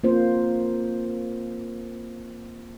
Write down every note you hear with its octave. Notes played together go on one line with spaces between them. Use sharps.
A#3 C4 F4 C5